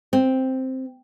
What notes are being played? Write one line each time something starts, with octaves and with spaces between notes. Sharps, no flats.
C4